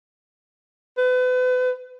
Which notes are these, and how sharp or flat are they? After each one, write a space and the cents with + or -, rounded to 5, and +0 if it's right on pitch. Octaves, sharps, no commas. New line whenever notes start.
B4 +35